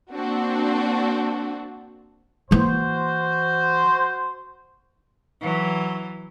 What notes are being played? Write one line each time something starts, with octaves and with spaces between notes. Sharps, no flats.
A#3 C4 D4 F#4
E3 A#3 F#4 C5
E3 F#3